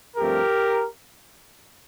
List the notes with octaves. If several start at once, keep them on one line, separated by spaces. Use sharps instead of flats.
G2 F3 A3 C4 G4 A#4